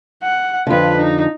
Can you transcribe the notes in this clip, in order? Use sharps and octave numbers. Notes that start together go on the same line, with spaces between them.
F#5
F2 D3 F4 B4
D#4